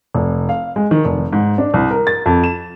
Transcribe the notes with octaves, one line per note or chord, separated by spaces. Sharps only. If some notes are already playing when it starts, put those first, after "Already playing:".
F1
F5
G#3
D#3
F1
G#2
D4
C2
A#4
A6
F2
E7